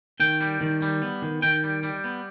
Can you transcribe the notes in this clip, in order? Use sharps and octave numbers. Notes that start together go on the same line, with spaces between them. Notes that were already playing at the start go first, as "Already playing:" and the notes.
D#3 G5
G3
D#3
G3
B3
D#3
D#3 G5
G3
G3
B3